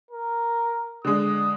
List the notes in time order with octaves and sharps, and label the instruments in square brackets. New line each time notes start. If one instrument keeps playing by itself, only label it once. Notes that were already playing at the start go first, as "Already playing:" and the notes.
[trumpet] A#4
[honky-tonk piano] D3 G#3 [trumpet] D#6